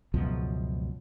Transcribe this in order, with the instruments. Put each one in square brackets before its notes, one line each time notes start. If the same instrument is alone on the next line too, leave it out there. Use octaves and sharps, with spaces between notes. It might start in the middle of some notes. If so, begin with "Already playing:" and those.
[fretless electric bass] C#2 F#2 B2 F3